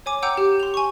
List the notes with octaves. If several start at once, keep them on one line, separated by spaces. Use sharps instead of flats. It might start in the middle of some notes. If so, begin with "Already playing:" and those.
C#5 G#5 D6
F#5 G5 A#5 D6 E6 G6
G4
C6 F7
G#5 C#6